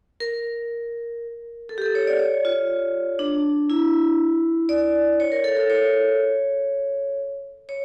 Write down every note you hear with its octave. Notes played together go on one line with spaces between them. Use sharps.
A#4
A4
G4
A4
C#5
D5
C#5
F4
D4
E4
D5
C#5
A#4
A4
A4
C#5
C#5